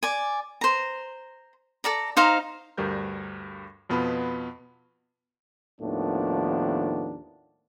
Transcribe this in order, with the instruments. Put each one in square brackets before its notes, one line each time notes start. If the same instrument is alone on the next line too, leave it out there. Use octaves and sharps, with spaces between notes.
[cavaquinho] D5 G#5
C5 A#5
A4 D5 A#5
D#4 C5 F5 A#5
[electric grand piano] D2 G2 G3 A#4 G6
F2 B2 B3 F4 B4 B5
[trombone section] D#2 A2 D#3 F3 B3 D4